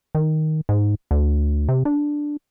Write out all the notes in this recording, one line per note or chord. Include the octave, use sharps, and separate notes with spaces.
D#3
G#2
D2
C3
D4